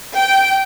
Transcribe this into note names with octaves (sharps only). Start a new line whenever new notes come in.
G5